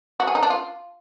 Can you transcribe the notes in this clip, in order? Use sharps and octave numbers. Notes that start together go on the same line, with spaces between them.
F#4
G#4
D#4
D4
F4